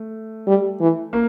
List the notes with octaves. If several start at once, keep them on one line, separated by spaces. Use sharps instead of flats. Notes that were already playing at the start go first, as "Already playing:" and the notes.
Already playing: A3
G3
E3
A#3